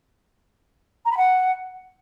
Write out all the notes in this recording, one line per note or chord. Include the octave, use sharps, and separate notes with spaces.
A#5
B5
F#5